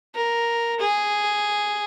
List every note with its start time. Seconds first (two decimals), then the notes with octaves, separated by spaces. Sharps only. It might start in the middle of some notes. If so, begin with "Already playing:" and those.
0.15 A#4
0.80 G#4